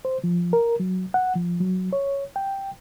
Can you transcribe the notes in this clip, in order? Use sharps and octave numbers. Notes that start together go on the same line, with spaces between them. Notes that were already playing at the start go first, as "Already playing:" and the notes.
C5
F3
A#4
F#3
F#5
F3
F#3
C#5
G5